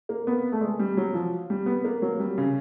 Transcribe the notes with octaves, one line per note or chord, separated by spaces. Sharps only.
A#3
B3
A3
G#3
G3
F#3
F3
G3
B3
A#3
F#3
G3
C#3